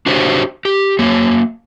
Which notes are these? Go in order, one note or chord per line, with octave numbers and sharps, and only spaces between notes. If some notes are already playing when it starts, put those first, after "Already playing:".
D4 F#4 G4 C5 C#5
G4
F#3 A#3 C#5